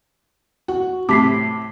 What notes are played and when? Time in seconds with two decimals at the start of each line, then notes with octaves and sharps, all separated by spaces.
0.68 F#4
1.09 A2 C3 D6 B6 C7